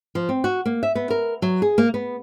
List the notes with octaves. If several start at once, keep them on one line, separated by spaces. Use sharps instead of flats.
F3
C4
F#4
A#3
E5
B3
A#4
F#3
G#4
A#3
B3